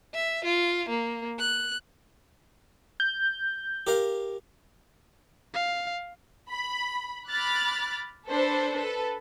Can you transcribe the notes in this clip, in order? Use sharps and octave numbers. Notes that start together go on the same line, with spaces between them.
E5
F4
A#3
F#6
G6
G4 A#4 F5
F5
B5
B5 D6 F6 F#6 A6
D4 A4 B4 C5
A4 B4